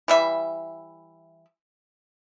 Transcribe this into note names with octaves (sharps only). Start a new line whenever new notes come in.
E3 G3 E5